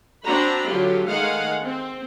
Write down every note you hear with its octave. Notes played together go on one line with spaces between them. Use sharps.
C4 D4 F#4 A#5 B5
D3 F#3 F4 G4
D#3 G#3 A3 G#4 F5 F#5
C4